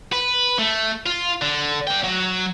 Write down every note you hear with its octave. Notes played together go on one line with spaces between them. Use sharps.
B4
A3
F4
D3
D4 G5
F#3 F#4